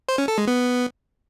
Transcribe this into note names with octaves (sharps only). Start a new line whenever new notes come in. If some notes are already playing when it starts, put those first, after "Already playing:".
C5
C#4
A4
G#3
B3